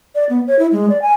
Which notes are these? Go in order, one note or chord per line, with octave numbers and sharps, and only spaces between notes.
D5
B3
C#5
E4
G#3
D5
G#5